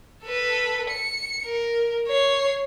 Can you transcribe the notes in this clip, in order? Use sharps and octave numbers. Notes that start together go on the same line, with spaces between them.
A4 B4
C#7
A#4
C#5 C7